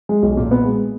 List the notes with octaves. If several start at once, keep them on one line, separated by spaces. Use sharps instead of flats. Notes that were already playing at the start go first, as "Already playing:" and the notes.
G#3
B1
A#2
B3
G#3